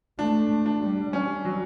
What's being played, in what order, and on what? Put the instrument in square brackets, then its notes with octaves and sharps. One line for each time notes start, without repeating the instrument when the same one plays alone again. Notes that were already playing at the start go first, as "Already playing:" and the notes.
[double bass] A3 [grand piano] D4
[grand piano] D4
[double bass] G3
[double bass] G3 [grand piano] C#4
[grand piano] F#3